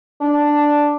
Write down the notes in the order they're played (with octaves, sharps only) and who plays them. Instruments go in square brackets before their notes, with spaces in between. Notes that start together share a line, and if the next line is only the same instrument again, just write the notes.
[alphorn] D4